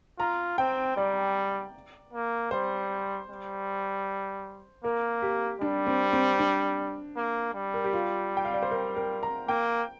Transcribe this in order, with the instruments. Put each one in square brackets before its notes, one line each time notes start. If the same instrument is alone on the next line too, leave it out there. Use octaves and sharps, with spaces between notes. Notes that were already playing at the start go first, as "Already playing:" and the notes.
[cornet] F4 [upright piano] A#5
[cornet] C4 [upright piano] G5
[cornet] G3 [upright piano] D5
[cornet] A#3
[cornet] G3 [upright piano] C5
[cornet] G3
[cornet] A#3 [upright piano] A#4
[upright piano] G4
[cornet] G3 [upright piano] D4
[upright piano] C4
C4
D4
[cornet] A#3
G3
[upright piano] A#4
G4
F4
G5
F5
D5
C5
A#4
A#4
A#5
[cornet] A#3 [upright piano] G5